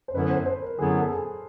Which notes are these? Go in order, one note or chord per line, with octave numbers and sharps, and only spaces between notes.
C5
F#2 D3 F#3 B3 E4 B4
C5
C5
A#4
F#2 D3 F#3 B3 E4 G#4
A4
G#4